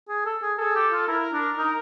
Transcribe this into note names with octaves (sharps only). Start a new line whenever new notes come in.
G#4
A4
G#4
G#4 A4
G4
F4
E4 A#4
D4
D#4